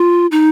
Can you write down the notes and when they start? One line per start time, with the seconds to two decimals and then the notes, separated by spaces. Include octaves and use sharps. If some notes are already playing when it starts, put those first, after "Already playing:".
Already playing: F4
0.31 D#4